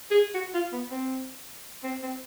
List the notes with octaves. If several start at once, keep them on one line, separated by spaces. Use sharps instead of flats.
G#4
F#4
F4
B3
C4
C4
C4